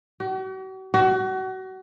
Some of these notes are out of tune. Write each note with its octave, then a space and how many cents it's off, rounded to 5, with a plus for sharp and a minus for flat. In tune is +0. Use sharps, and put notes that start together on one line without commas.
F#4 +45
F#4 +30